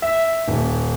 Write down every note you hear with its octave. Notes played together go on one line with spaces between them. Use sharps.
E5
D#1